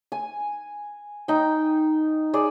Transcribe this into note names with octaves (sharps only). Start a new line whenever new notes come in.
G#5
D#4 G5
G#4 D5